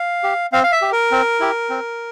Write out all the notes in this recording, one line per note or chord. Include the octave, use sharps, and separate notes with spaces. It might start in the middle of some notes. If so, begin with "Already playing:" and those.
Already playing: F5
G4
C4 F5
F5
E5
G4
A#4
C4
E4 G4
C4